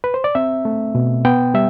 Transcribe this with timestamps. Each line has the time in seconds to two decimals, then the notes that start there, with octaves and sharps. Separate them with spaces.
0.04 B4
0.14 C5
0.24 D5
0.35 C4 E5
0.65 A3
0.95 B2
1.25 B3 G5
1.54 G3 E5